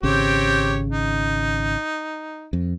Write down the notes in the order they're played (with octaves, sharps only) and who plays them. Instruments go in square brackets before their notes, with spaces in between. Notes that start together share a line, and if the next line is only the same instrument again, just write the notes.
[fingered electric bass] G#1 C#3 [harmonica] C4 G4 C#5
[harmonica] D#4
[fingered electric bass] F2